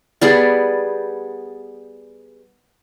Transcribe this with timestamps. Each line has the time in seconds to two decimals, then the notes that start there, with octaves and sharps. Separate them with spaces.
0.21 G3 B3 G#4 D5